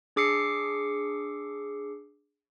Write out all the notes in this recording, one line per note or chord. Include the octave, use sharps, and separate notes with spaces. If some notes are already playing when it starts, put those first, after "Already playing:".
D4 G#4 D6 E6 C7 C#7